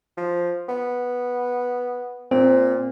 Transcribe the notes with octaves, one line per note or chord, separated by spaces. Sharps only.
F3
B3
A#2 C4